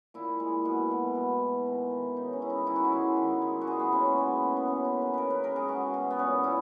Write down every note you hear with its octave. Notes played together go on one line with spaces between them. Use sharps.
A#2 E4
G#3
B2
B2
B2
B2
D#3
D#3
C#3 D#4
C#4
G#3 E4
D#4
D#3 E4
F#4
E4
G#3
D#3
G#3
F#4
A#2 G#4
B3
G#3 C#4
C#4
B2 B3
B2 B3
B3
B2 C#4
D#4
A#3
B4
C#3 A#4 B4
B4
G#3 A#4
G#4
B2 F#4
B2
B3
A#2 C#4
A#2 E4